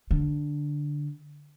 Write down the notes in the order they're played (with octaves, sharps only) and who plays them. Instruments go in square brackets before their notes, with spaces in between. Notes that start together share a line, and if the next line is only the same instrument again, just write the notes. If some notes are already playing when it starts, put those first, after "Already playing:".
[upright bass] D3